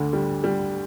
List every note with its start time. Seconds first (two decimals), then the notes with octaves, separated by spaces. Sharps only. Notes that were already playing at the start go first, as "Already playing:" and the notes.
Already playing: D2 D3
0.13 G3
0.44 G3